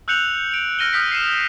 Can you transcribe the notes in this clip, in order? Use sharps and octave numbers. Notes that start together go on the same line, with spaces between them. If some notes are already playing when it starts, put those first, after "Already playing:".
E6 F#6 G6 C#7 F7 F#7
D7 F7
F6 A#6 D#7 G7
D#6 F6 G6 B6 D7
C7 C#7 D#7 E7